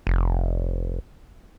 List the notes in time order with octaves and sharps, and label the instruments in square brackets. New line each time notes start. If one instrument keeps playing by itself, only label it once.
[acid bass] F1